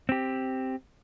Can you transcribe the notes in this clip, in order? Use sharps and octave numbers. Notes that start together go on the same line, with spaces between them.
C4 G4